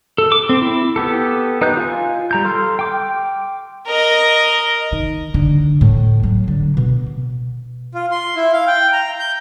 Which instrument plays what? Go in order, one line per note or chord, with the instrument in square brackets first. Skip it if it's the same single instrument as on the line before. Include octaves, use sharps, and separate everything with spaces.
[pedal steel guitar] A4
D6
C4
E4
B3 G4 A4
D#4 B4 F#6 G6
F4 F5 G#5
G3 A#5 G6
A4 C6 F6
G5 D6 G6
[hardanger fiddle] A#4 D#5
[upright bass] D#3
D3
A2
F#3
D3
B2
[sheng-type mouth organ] F4
C6
E4
F5
G5
A#5
G6